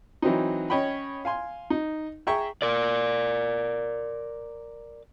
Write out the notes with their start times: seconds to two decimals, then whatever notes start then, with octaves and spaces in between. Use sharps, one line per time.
0.22 E3 F#3 C4 D#4
0.70 C#4 C#5 D#5 G5 B5
1.25 F5 G#5 C6
1.70 D#4
2.27 G#4 E5 G5 A#5 C#6
2.62 A#4 D5